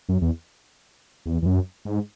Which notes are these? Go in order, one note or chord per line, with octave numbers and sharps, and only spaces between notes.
F#2
E2
E2
E2
F#2
G#2